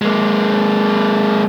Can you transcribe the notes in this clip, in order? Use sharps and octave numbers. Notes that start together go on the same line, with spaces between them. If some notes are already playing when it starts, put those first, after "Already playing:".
G#3 A#3